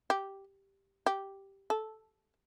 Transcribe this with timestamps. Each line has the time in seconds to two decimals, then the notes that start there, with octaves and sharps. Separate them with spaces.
0.10 G4
1.06 G4
1.70 A4